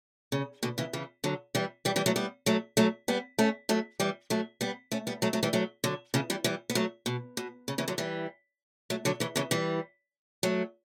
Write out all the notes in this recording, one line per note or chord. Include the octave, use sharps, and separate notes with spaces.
C#3
B2 D3
C#3 E3
C#3 E3
D3 F#3
E3 G3
E3 G3
E3 G3
F#3 A3
G3 B3
F#3 A3
F#3 A3
G3 B3
A3 C#4
F#3 A3
E3 G3
F#3 A3
G3 B3
A3 C#4
G3 B3
F#3 A3
F#3 A3
E3 G3
F#3 A3
D3 F#3
C#3 E3
E3 G3
E3 G3
B3
F#3 A3
B2
B2
C#3
C#3 E3
D3 F#3
E3 G3
F#3 A3
D3 F#3
C#3 E3
C#3 E3
E3 G3
F#3 A3